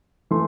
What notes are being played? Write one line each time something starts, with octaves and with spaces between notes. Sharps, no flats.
E3 A3 C6